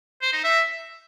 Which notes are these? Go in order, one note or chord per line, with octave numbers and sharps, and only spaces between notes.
C5
D#4
E5